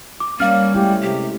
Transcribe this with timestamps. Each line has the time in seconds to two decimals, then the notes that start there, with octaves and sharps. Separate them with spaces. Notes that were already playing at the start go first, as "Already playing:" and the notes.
0.20 D6
0.40 G3 A#3 C#4 F5 F6
0.75 G#3 A3 E4 G4
1.02 C3 G4